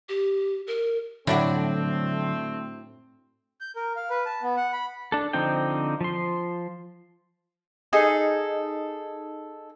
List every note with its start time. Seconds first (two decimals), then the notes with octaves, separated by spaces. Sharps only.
0.09 G4
0.67 A#4
1.27 A2 D3 F#3 A3 C4 D4 E4 F#4
3.61 G6
3.76 A#4
3.96 F5
4.10 B4
4.26 A5
4.42 B3
4.57 F#5
4.73 B5
5.12 D4 A4
5.33 D3 F3 C4 D#4 G5
6.01 F3 C6
7.93 D#4 G#4 A4